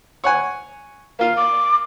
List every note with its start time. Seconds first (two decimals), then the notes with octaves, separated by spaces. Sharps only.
0.24 C#5 F#5 G#5
1.19 A#3 F4 F5
1.36 D6